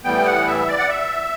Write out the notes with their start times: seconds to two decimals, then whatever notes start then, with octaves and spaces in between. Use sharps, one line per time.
0.04 A2 E3 G3 B3 G5
0.25 F#5
0.47 E5
0.68 D5
0.79 F#5
0.89 E5